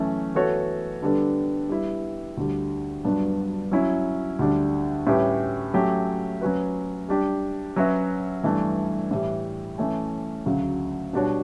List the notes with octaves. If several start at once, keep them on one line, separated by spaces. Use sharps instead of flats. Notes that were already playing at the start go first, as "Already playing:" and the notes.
Already playing: F#2 E3 A3 C#4
E3 B3 F#4 A4 C#5
D3 G3 B3 D4 A4
G3 B3 E4
D2 D3 G3
G2 F#3 B3 D4
F#3 C#4 E4
D2 D3 G3 D4
A2 G3 C#4 G4 B4
F#3 A3 C#4 G4
F#3 C#4 F#4 B4
G3 D4 G4
F#3 C#4 F#4 B4 E5
G2 E3 A3 D4
A2 E3 G3
E3 A3 C#4
D2 C#3 F#3
B2 G3 D4 F#4 C#5